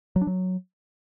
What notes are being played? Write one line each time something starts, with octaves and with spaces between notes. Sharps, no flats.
F#3
D4
F#3